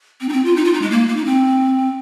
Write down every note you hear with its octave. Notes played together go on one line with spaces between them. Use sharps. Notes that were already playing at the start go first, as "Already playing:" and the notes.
C4
D#4
C4
F4
D#4
F4
D#4
G#3
A#3
A#3
D#4
C4